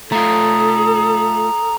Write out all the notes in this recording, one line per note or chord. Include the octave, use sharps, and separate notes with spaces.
A3 F4 A4 A#5 D#6